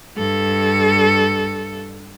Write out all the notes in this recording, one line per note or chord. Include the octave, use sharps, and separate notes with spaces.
G2 A4